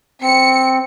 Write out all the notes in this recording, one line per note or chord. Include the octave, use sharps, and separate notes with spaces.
C4 C#7